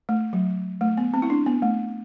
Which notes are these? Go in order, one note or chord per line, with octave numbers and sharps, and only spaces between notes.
A3
F#3
A3
B3
C4
E4
D4
B3
A3